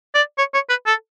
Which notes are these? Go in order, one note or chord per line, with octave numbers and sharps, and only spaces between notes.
D5
C#5
C#5
B4
A4